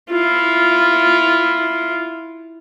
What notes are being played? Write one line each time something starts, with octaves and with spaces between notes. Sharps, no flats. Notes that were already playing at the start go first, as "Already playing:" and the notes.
E4 F4